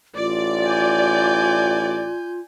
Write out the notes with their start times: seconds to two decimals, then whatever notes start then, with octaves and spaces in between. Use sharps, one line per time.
0.17 A1 F4 D5
0.66 G#5 G6